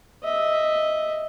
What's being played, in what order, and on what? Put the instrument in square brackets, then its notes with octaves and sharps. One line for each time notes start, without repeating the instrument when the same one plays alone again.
[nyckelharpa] D#5 E5